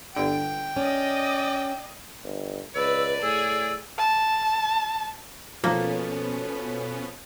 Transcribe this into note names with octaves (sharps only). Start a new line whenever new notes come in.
G1 D3 G5 D7
C#4 D5 D#5
G1
C#2 B4 D5 E6
A2 G#4 E6
A5
B2 F3 A#3 B3 C#4 A4